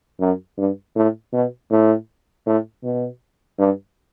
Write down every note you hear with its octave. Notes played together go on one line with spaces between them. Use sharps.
F#2
G2
A2
B2
A2
A2
B2
G2